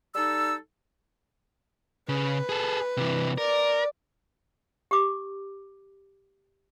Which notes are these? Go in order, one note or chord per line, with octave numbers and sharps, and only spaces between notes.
G3 D#4 A4 E6
C#3 B4
G#4 A4
C3 E3
A#4 D5
G4 D6